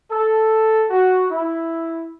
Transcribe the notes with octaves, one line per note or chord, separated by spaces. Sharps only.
A4
F#4
E4